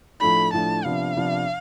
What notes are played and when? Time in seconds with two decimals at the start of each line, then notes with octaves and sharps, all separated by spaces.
0.20 A2 F3 A3 D4 B5
0.53 A2 F3 A3 D4 A5
0.85 C3 F3 B3 D4 F5
1.16 C3 F3 B3 D4